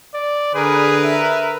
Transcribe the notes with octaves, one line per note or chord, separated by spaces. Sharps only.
D5
D3 G#4 A#4 B4
E5